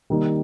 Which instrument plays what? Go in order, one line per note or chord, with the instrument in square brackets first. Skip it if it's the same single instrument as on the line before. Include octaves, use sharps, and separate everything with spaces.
[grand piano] D#3 G3 A#3 D#4